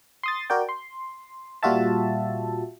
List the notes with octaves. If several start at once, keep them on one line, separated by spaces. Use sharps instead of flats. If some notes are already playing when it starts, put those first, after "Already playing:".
C6 D#6 A6
F#4 A#4 D5 G5
C6
A#2 G3 F4 F#4 E5 A5